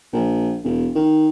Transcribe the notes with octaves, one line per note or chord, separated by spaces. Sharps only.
A#1
E1
D#3